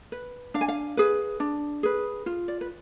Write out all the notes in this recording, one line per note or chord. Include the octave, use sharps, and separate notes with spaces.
B4
D4 F5
G#5
F5
G#4 B4
D4
G#4 B4
F4
D5
B4